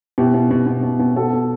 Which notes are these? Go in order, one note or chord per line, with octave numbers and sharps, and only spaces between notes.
B2 E4 G4
B2
B2
B2
B2
B2
B2 F#4 A4
B2